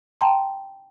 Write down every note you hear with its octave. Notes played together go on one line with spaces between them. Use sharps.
G5 A5 A#5 C6